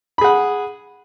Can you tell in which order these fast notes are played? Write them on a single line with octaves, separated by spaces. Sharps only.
B5 G#4 F#5